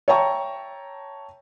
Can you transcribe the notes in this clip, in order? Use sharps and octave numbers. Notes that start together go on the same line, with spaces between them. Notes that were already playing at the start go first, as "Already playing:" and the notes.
C#5 E5 G5 A5 A#5 C#6